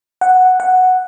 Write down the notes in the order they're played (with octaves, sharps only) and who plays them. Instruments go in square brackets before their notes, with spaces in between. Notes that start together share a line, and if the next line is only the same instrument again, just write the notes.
[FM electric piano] F#5
F#5